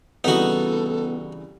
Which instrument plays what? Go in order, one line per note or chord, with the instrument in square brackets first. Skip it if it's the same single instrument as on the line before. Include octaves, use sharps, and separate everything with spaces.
[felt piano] C2 C#3 E3 [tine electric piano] B3 [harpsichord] D#4 F#4 [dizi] A4